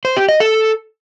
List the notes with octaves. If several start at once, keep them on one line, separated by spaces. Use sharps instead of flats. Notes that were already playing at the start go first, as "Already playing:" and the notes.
C5
G4
D#5
A4